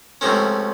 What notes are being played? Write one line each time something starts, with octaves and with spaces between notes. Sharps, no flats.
C#2 C3 F3 A3 C#4 A#5